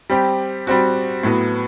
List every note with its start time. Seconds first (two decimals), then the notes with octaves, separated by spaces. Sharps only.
0.10 G3 C4 G4
0.67 G3 C4 F#4
1.23 A2 F#3 B3 F#4